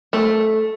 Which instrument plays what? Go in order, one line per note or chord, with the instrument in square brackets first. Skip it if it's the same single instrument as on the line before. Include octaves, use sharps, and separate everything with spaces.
[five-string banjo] A3